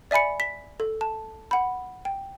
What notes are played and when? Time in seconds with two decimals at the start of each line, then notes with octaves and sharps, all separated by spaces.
0.11 D5 E5 G#5 B5 C#7
0.40 B6
0.80 A4
1.01 A5
1.51 F#5 B5
2.05 G5